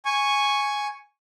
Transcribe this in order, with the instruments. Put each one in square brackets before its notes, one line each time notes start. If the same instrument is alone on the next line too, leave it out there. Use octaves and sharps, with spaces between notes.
[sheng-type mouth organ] G#5 C#6